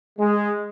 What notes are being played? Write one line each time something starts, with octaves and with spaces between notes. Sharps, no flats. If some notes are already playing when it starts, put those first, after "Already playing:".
G#3